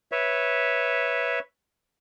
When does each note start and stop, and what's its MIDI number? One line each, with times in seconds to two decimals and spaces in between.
0.12 1.39 71
0.12 1.39 73
0.12 1.39 76